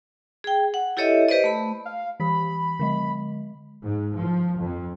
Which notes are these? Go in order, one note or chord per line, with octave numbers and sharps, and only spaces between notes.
G#4 G5
F#5
E4 G4 A4 C#5 D#5 E5
G4 B4 C5 D5 D#5
A3 B5
F5
E3 G4 B5
D3 G#3 D#5
G#2
F3
F2